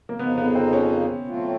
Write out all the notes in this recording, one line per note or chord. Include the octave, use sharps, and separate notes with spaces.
A#3
F2 C#3 F3 A#3 B3 D#4
B3
C4
C#4
A2 F#3 A3 C4 F4